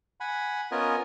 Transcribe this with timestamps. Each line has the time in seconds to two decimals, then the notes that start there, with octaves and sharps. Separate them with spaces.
0.20 F#5 G#5 B5
0.71 B3 C#4 F4 A#4 D#5 G#5